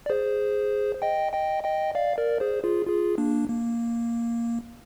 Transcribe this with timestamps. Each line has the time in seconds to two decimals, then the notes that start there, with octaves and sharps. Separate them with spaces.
0.06 D5
0.10 G#4 C5
1.02 D#5 G5
1.33 D#5 G5
1.63 D#5 G5
1.95 D5 F5
2.17 A#4 D5
2.40 G#4 C5
2.64 F4 G#4
2.86 F4 G#4
3.18 A#3 D4
3.48 A#3